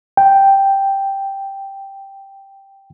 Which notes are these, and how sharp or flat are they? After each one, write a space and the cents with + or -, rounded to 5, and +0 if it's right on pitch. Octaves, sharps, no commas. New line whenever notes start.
G5 +0